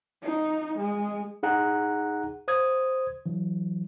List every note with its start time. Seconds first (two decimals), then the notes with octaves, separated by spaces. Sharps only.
0.23 D#4
0.79 G#3
1.43 D#4 G#4 F#5 A#5
2.48 C5 D#6 G#6
3.26 E3 F#3